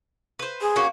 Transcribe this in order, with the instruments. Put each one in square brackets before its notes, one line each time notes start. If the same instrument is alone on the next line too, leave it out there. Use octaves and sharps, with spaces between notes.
[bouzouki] B4 C5
[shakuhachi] G#4
[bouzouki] A#3 C#4 F#4